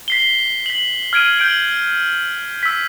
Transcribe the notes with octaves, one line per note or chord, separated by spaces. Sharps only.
B6 C7 G7
B6 F#7
F6 G#6 D7 D#7
G6 G#6 D7 F#7 G7
E6 B6